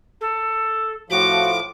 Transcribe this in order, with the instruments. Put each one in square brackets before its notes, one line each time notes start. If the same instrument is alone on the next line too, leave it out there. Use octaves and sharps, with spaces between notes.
[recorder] A4
[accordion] A2 F3 [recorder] F#4 [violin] D6